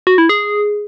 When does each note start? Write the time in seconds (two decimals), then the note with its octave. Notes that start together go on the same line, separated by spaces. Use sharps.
0.07 F#4
0.18 E4
0.29 G#4